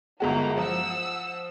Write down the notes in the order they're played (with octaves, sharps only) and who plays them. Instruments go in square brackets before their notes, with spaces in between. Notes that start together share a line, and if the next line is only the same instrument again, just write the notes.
[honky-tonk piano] G1 G#3 F#4 [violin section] A#3 A#5
[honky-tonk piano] F3 [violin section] F#5 E6